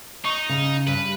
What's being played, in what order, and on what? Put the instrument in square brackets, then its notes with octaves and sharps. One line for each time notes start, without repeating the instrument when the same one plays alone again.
[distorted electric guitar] D#4 [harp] C#6
[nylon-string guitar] C#3
[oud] G2 [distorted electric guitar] B4